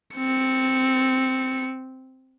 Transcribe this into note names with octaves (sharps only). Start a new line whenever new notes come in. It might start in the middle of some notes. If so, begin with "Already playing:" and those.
C4 C#7